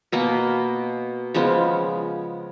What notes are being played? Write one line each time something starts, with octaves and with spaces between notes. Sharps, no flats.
B2 A#3 B3
C#3 F3 G#3 B3